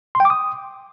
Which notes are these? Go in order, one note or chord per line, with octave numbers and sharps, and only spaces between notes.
C6
G5
D6
D#6